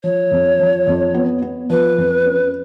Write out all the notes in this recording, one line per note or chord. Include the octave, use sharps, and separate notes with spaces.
F3 C#5
F2
F3
F2
B3
B3
F3 B4
F2
C#4